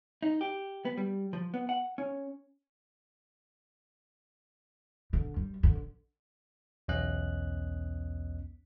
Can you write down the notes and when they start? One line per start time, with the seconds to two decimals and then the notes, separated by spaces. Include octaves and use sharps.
0.23 D#4
0.41 G4
0.85 B3
0.98 G3
1.33 F3
1.54 B3
1.69 F#5
1.98 C#4
5.13 D3
5.36 G3
5.63 D3
6.88 B1 E2 B3 C#4 D#5 F#6